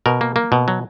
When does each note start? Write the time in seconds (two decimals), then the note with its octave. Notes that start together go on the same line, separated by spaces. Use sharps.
0.06 B2 A#4
0.21 A#3
0.36 A#3
0.52 B2
0.68 F#3